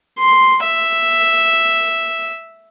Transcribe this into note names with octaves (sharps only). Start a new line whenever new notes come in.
C6
E5